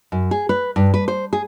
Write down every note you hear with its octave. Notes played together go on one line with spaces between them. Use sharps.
F#2
G#4
B4
G2
B4
C5
G#4